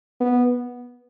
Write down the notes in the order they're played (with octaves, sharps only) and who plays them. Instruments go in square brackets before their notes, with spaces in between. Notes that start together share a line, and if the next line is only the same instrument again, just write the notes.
[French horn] B3